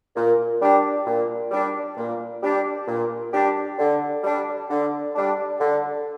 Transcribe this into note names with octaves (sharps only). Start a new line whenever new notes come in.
A#2
G3 D4 G4
A#2
G3 D4 G4
A#2
G3 D4 G4
A#2
G3 D4 G4
D3
G3 D4
D3
G3 D4
D3